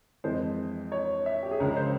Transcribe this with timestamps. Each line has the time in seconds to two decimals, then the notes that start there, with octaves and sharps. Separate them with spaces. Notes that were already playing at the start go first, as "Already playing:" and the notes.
0.24 F2 E3 G#3 C5
0.92 C#5
1.26 E5
1.43 G4
1.51 G#4
1.60 C#2 C#3 F3 G#3 A#4
1.76 C5